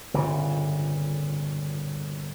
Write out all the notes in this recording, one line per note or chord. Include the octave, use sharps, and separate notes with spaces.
G1 A#2 C#3